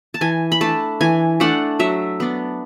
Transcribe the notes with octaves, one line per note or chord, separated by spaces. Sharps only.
A5
E3 G#5
B5
A3 D4 A5
E3 G#5
A3 D4 F#5
F#3 E5
B3 D4